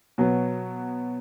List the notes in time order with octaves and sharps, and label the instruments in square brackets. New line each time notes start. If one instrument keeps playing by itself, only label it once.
[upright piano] B2 F#3 B3